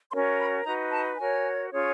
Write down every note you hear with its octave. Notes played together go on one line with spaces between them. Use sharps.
C#4 F#4 A#4 C#5 C6
B5
D#4 F#4 B4 A#5
A5
F#4 A#4 C#5 G#5
C#4 F4 G#4 C#5